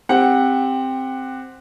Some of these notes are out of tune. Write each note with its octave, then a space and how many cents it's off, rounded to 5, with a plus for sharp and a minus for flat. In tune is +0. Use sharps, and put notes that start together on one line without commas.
C4 +0 G4 +15 F#5 +0